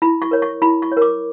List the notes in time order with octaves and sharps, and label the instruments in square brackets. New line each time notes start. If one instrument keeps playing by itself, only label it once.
[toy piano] E4 B5
C#6
A#4 C#5
C#6
E4 B5
C#6
C#5
A#4 D6